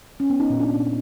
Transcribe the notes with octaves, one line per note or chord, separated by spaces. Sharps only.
C#4
B3
D#4
A#2
D4